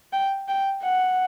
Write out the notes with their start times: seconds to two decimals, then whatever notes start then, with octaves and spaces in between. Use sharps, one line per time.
0.13 G5
0.48 G5
0.83 F#5